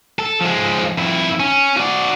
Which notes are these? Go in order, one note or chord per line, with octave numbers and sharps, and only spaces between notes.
A4
F3 G#3
F2 E4
C#4
F#4 D5